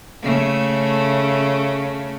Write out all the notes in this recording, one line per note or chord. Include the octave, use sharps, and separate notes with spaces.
C#3 A3